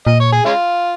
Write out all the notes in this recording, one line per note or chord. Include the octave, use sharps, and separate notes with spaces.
A#2 D#5
C#5
G#4
G#3 C#4 F4